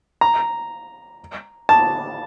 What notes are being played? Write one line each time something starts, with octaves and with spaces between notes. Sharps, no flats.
A#5
A5